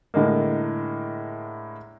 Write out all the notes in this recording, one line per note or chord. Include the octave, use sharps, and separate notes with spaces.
A2 D3 G#3 A#3